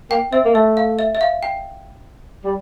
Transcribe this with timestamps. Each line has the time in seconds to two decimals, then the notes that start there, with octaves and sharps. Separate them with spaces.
0.11 A#3 G5
0.32 C4 E5
0.45 A#3
0.54 A3 E5
0.77 F5
0.99 E5
1.15 E5
1.21 F5
1.43 G5
2.44 G3